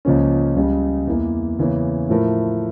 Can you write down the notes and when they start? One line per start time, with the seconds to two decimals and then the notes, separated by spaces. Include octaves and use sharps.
0.05 C#2 C#3 F3 A#3 C#4
0.56 C#2 C#3 G3
1.07 E2 E3 A#3
1.59 E2 C#3 E3 A#3 C#4
2.09 A2 F3 A3 E4 A#4